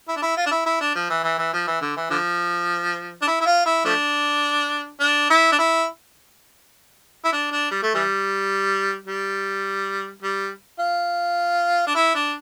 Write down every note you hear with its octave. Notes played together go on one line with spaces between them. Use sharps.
E4
D4
E4
F4
D4
E4
E4
D4
F3
E3
E3
E3
F3
E3
D3
E3
D3 F3
D4
E4
E4
F4
E4
F3 A3 D4
D4
E4
D4
E4
E4
D4
D4
G3
A3
E3 G3
G3
G3
F4
D4
E4
D4